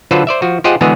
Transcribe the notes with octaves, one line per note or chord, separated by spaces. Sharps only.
D3 F#3 F4 A4 B4 C5
C5 D5 E5
F3 F#4
F4 G4 G#4 C5 D#5 F#5
D3 E3 G#3 B3 F#4 G#4